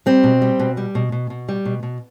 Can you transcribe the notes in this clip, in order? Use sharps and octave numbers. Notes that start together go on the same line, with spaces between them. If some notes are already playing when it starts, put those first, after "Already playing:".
G3 C4
B2
G3
B2
G3
B2
B2
B2
G3
B2
B2